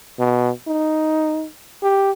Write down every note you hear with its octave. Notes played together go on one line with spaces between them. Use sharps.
B2
D#4
G4